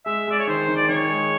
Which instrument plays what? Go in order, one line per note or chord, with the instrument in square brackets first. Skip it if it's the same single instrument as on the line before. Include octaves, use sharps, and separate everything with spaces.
[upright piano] G#3 [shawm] E5
[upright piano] G#3 [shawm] D5
[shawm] C#5
[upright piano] D#3 [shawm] C5
[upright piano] D#3
[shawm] D5
[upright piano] D#3 [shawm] C#5
[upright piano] G#3